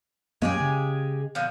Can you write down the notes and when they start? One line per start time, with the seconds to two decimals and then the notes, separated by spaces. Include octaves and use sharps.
0.42 F#2 G#3 A#3 C#4 G4 G#4
0.60 C#3
1.35 B2 D3 F3